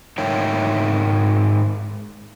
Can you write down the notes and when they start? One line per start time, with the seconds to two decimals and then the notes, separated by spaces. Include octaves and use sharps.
0.18 G#2 D#4 A#4 C#5 E5 G5